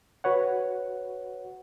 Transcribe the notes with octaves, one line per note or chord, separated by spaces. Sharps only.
F#4 B4 C#5 F#5